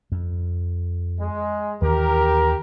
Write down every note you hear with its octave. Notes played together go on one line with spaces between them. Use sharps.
F2
G#3
D#2 D#3 E3 G4 A#4